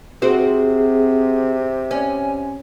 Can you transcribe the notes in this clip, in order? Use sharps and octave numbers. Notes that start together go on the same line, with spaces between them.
C3 C4 F#4 G#4 C5
C#4 G#5